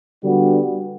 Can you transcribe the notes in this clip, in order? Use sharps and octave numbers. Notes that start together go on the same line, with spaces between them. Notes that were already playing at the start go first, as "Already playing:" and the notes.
D3 G3 B3 D4 F#4